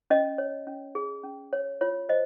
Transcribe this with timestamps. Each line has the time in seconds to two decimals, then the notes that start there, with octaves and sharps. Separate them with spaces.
0.10 C#4 D#5
0.38 C#5
0.67 C#4
0.95 G#4
1.24 C#4
1.53 C#5
1.81 F4 C#5
2.09 C5 D#5